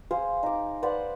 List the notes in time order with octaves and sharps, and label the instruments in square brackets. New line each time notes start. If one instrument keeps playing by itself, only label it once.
[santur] G#4 C5 F5
D#4 D6
B4 C5 D5 F#5